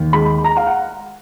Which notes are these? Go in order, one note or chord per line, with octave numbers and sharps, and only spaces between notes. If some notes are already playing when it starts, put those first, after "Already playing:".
Already playing: D#2
G#3 B5
A#5
F5
F#5